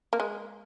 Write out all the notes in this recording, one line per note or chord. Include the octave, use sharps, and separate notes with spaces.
A#3
G#3